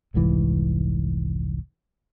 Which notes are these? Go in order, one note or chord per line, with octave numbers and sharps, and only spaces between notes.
F1 C2 G#2 E3